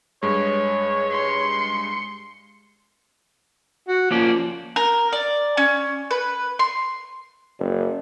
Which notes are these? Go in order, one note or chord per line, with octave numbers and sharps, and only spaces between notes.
G2 G#3 C#5
C6 C#7
F#4
F3 A#3 C#4 D5
A#4
D5
C#4
B4
C6
F#1